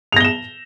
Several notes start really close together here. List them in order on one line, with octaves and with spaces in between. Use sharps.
F7 A#6 G7 E7